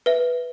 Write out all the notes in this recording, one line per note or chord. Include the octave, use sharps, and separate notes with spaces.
B4 E5